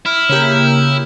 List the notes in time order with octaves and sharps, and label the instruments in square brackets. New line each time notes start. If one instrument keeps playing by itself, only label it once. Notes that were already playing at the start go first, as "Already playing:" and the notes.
[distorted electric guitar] E4 [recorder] F6
[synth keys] C#3 A#3 G4